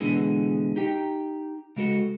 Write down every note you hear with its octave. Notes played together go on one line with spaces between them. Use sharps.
B2 D3 E3 G#3
D#4 G4 G5
C#3 G#3 F#4 A4